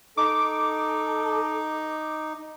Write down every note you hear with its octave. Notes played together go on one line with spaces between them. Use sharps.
D#4 A4 D6